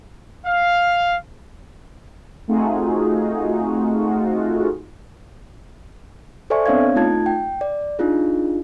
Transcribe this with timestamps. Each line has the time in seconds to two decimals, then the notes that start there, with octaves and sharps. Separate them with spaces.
0.44 F5
2.48 A3 C4 D#4 F4 F#4 G#4
6.50 A4 C5 D5 E5 G#5 C#6
6.66 B3 C4 D4 C#5 F5 G#6
6.96 A3 D#4 F4 A5 G#6
7.26 G5
7.61 D5
7.99 D4 D#4 F4 G#4